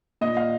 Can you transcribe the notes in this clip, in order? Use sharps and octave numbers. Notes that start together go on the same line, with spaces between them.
A#2 D#5
F5